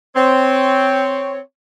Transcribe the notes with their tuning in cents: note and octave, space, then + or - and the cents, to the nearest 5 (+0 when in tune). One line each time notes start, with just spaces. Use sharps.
C4 -5 C#5 +0